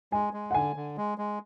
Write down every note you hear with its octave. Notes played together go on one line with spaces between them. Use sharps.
G#3 G#5
G#3
F#5
D3 G#5
D3
G#3
G#3